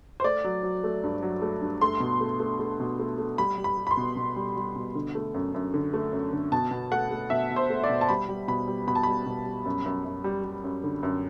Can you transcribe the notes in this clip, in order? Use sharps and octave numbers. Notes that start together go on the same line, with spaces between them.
C5
A3 D5
F#3
F#3
A3
G2
F#3
A3
G2
A3 C6
B2
A3
A3
A3
B2
A3
A3
G3 B5
G3
B5
G3
B5
C6
B2
B2
G3
G3
B2
D3
A3
F#2
F#2
D3
A3
F#2
D3
B2 A5
B2
A3 F#5
A3
B2 E5
B2
C5
A3
D5
B2
A5
G3 B5
G3
B2 B5
G3
B2 B5
A5
G3 B5
B2
G3
F#2
F#2
F#2
G3
G3
F#2
D3
F#2